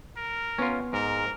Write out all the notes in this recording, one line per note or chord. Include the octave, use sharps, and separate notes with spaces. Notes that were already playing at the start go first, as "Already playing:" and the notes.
A#4
B3 C#4 F4
G#2 A#4